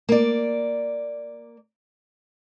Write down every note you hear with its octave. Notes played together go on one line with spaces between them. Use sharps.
A#3 D5